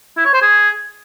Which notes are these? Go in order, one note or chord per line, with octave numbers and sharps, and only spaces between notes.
E4
C#5
C5
G#4